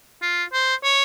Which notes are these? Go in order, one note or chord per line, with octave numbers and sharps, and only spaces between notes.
F4
C5
C#5